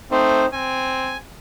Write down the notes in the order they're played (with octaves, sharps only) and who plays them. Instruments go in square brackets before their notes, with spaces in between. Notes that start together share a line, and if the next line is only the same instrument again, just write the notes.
[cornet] A3 [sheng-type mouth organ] C4 D#4 C5
[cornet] C4 [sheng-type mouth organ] G#5